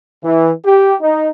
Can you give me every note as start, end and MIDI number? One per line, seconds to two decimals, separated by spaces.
0.24 0.51 52
0.65 0.95 67
1.01 1.29 63